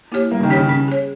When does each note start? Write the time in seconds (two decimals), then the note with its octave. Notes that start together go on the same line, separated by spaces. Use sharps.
0.12 A#3 E4 G4 C#5
0.31 G3 A#3
0.40 C#3
0.43 D#3
0.50 C#4 G4 C#5
0.56 C#3
0.69 C#4
0.88 G#4 C#5